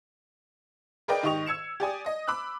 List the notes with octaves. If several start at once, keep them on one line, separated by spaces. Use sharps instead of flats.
G#4 A#4 B4 D5 D#5 G5
G#2 D#3 G4 D#5 C#6 F7
E6 G#6 C#7 E7
G4 D5 G#5 D#6
D#5 D#6
B5 D6 E6 F#6